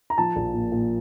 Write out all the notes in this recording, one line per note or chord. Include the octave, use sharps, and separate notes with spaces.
A#5
F3 A5
A#1
A#2
A#2